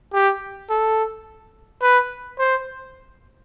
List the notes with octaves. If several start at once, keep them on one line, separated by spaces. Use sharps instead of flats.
G4
A4
B4
C5